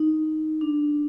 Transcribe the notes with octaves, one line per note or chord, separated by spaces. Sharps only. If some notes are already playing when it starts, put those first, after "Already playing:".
Already playing: D#4
D4